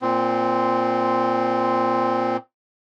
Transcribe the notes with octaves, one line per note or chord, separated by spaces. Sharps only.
A#2 C4